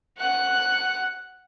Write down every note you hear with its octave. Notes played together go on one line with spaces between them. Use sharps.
F#5 F#6